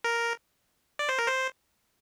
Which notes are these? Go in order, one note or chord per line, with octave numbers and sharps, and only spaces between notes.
A#4
D5
C5
A#4
C5